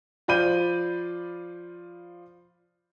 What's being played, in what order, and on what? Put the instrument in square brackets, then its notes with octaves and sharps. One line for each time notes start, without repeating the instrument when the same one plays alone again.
[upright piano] F3 F4 D5 B5 G6 D#7